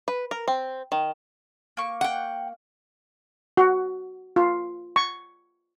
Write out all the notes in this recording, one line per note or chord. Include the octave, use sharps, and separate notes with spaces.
B4
A#4
C4
D#3
A#3 C#6
F#5 G5
F#4
F4
C#6